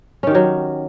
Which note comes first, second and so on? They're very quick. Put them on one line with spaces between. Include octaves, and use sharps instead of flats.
C#4 D#3 G4 F#3